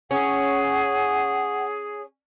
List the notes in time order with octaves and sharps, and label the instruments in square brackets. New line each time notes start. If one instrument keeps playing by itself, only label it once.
[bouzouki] C#4 [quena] G#4 [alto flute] F#5